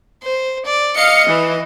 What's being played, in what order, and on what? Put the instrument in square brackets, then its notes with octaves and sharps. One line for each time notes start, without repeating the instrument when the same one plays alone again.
[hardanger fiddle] C5
D5
[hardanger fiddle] D#5 [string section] F5 C#7
[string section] E3